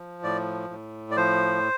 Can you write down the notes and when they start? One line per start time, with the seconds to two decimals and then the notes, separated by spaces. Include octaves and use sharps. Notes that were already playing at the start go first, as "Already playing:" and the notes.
Already playing: F3
0.23 A2 D5
0.70 A2
1.11 D5
1.17 F3 C5